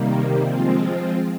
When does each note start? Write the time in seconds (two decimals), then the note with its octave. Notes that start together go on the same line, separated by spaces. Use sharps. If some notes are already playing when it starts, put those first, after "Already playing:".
Already playing: C3 D#3 G3 A#3
0.40 F3 G#3 C4 F4